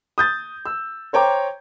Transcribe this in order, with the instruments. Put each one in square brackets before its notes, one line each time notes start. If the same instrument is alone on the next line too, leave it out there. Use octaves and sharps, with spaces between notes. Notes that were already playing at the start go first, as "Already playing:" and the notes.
[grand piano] D#6 G6 A6
E6
C5 C#5 G5 A#5 D6